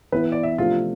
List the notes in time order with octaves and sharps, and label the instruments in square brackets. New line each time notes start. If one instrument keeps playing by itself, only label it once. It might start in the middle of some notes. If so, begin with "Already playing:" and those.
[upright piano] E3 B3 E4 [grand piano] B4
[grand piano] D5
E5
[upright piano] C3 F3 A3 D4 [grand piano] F4